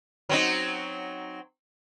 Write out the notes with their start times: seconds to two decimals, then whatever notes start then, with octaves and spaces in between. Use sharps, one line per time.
0.29 F#3 C4 D#4